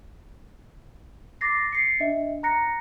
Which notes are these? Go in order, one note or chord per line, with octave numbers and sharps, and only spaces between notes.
D6 A6 A#6 C7
A6 C7 C#7
D4 D#5 E5
A#5 F#6 A#6 C#7